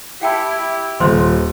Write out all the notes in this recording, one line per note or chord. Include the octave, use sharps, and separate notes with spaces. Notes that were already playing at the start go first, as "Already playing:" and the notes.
E4 G4 F5 G5 A5
D#1 C5 C6